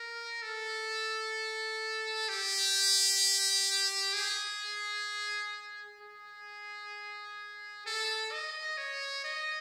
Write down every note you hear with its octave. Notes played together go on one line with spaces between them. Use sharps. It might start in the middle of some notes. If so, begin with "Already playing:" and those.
Already playing: A#4
A4
G4
G#4
G#4
A4
D#5
C#5
D#5